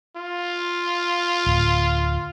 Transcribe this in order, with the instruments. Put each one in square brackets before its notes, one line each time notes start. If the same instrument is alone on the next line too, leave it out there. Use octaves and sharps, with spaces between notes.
[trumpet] F4
[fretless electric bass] D1